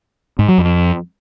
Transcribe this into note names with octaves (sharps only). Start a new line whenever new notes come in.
G#2
F#3
F2